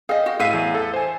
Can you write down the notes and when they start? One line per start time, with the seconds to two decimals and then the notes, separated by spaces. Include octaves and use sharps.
0.09 G#4 D#5 F5 G5
0.26 F#4
0.39 A2 G#4 E5 F5 D#7
0.53 E2
0.74 A4
0.94 C5 G#5